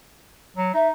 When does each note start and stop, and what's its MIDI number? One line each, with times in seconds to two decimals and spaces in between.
0.56 0.71 54
0.74 0.92 63
0.74 0.87 76